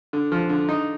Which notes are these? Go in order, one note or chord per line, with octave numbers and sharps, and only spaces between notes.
D3
F3
D3
D#4